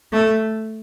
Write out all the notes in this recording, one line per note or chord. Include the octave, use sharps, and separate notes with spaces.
A3